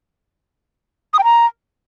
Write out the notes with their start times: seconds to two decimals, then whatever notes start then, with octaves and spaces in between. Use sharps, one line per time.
1.14 D#6
1.19 G5
1.24 A#5